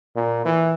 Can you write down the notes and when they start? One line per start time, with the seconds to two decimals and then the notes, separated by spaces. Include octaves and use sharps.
0.16 A#2
0.45 E3